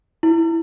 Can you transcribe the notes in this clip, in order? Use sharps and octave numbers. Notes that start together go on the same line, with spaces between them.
E4